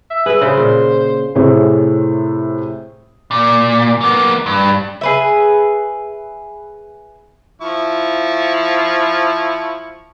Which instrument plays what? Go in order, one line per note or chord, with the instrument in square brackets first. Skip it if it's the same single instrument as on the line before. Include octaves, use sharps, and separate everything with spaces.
[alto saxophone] E5
[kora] G#4 E5 [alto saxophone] B4
[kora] C#3 B4 [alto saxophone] C5
[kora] A#2
[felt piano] A2 C3 G#4 C5 C#5
[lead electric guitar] A#2
A#3 B3
G2
[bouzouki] G#4 B4 E5
[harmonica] F3 E4 C#6